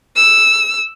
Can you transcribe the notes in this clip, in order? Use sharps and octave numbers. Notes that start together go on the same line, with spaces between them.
E6